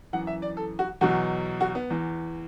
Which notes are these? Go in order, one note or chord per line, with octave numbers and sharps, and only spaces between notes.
F#2 E3 F#5
E5
D5
A4
F#4
E2 B2 F#3 F#4
F#4
B3
E2 E3